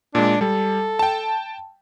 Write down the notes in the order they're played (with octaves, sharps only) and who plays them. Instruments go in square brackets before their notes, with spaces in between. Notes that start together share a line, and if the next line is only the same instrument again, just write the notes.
[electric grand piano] A#2 G#3 [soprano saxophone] D4
[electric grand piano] G3 [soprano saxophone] A4
[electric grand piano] G5 A5